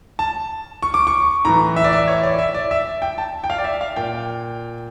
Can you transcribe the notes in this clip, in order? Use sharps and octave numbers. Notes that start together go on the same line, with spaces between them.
A5
C#6
D6
C#6
A2 E3 A#5
E5
D5
E5
C#5
D5
E5
D5
E5
G5
A5
G5
F5
D5
E5
F5
A#2 G5